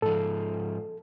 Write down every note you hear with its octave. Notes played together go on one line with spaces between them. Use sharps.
G#2 F3 A4